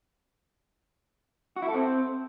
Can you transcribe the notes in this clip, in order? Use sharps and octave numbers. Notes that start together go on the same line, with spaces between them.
F#4
E4
A4
C4